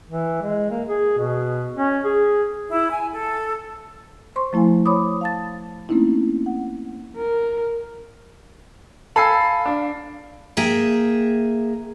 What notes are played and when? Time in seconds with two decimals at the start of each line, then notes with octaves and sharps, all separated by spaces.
0.10 E3
0.42 G#3
0.71 A#3
0.89 G#4
1.18 B2
1.76 C#4
2.04 G#4
2.70 E4
2.90 G#5
3.11 A4
4.36 C5 C6 C#6
4.53 F3 A3 E4 F5 G#5
4.86 C5 C#5 B5 D6 D#6
5.21 F5 A5 A6
5.89 A3 A#3 C4 C#4 D#4 E4
6.46 F#5
7.17 A#4
9.16 A4 F5 G#5 B5 E6 C7
9.65 D4
10.57 A#3 G#4 E5 G5